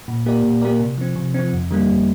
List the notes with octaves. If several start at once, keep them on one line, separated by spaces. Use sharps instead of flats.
A#2
A#3 G4 A#4 D5
A#2
A#3 G4 A#4 D5
C3
F3 C4
C3
F3 C4
F2
D3 G3 A#3
F2